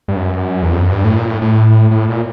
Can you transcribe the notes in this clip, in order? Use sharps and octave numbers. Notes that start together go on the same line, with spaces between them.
G2
F#2
E2
F2
F#2
G2
A2
A#2
A2
A2
A2
A#2